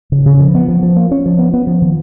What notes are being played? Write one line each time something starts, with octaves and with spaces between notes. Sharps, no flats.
C#3
C#3
F3
B3
F3
F3
A#3
C#4
F3
B3
B3
F3
D#3